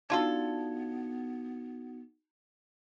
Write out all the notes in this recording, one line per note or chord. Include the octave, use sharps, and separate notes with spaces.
B3 D4 D#4 F4 F#4 A4 G#6